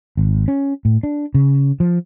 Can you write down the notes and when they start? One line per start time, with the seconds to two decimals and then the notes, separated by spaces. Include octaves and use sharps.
0.17 G#1
0.48 C#4
0.85 A2
1.03 D4
1.34 C#3
1.80 F3